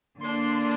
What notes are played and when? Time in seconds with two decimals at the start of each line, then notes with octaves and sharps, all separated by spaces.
0.19 D3 A#3 D4 C6